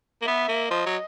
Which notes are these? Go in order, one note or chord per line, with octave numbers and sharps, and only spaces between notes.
A#3
B3 E5
A#3
F3 D#5
F#3